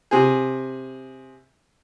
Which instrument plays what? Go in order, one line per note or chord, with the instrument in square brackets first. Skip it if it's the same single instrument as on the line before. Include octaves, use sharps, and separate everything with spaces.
[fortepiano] C3 G#4